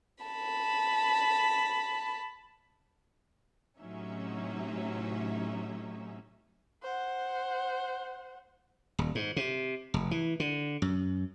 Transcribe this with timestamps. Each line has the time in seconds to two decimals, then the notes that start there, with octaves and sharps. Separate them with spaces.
0.24 A5 B5
3.80 A2 C3 F#3 C#4 D#4 E5
6.83 C5 F#5
8.99 D#1
9.15 G#2
9.36 C3
9.94 F1
10.11 E3
10.40 D3
10.82 F#2